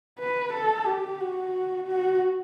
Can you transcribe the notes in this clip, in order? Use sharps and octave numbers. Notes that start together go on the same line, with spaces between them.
B4
A4
G4
F#4
F#4